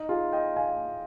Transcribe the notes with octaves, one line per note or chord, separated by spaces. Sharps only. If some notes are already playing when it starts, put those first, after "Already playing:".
Already playing: D#4
F4 G#4
D#5 G5
F5 G#5